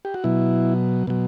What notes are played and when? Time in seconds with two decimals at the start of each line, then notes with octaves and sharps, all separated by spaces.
0.05 G4
0.14 F#4
0.24 B2 F#3 E4
1.07 B2 F#3